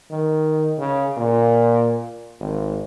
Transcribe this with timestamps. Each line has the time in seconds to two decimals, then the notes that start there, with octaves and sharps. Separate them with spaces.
0.11 D#3
0.78 C#3
1.17 A#2
2.40 G#1